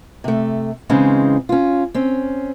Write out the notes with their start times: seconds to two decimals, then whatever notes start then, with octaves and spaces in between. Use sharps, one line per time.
0.24 C3 A3
0.89 C#3 E3 G#3 C4 C#4 D#4
1.49 C#4 F4
1.94 C4 C#4